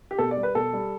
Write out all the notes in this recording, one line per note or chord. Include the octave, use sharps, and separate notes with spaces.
G4
B2 A4
D5
G3
B4
B2 A4
G3